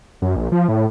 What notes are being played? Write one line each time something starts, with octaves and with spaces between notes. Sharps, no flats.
F#2
A#1
F3
A2